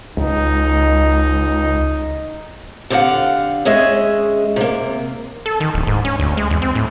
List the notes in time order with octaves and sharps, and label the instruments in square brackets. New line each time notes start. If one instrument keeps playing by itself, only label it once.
[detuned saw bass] C#2 [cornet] D#4
[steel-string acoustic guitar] D3 G4 C5 D#5 F5 F#5
G#3 C#4 G#4 D#5 E5
C3 A#3
[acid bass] A4
D#3
D1
G#2
C#4
D2
G#3
E2
C4
A2